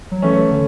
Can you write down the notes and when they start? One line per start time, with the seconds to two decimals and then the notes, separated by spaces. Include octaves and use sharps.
0.11 F#3
0.22 E3 A3 C#4
0.51 D3